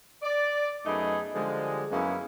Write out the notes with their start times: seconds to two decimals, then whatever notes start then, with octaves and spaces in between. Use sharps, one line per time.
0.23 D5
0.86 F#2 A3 B3 D#4 G#4 B5
1.34 D3 F3 G3 G#3
1.91 F#2 G#3 A#3 B3 C#4 E4